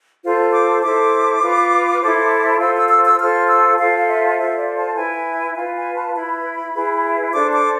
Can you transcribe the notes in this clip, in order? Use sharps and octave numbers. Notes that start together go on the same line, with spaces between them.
F4 A4 C5
D6
E4 A4 C5 D6
F4 B4
E4 A4 C5
F4 A4 C5 E6
E6
E6
E6
F4 A4 C5 F6
E6
F4 A4 C5 F5
F5
E5
F4 A4 C5 E5
D5
A5
E4 B4 G#5
F4 B4 G#5
G#5
A5
E4 B4 B5
E4 G#4 B4
D4 A4 C5 D6
D6